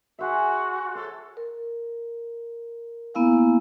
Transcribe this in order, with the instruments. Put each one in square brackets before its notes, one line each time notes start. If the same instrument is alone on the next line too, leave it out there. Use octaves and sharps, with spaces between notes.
[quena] F#4 [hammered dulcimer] G#4 C5 E5
[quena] A4 [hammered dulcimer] C5 C#5
[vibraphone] A#4
A#3 B3 E4 F5 G#5